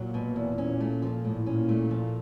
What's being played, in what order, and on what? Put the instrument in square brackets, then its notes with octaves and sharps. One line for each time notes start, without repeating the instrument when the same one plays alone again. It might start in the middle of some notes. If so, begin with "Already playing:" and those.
Already playing: [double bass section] A#2 [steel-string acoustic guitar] F#3
[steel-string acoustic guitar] B2
E2
C#4
A3
F3
A2
[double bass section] A#2 [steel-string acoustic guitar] C#4
[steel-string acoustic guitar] A3
F3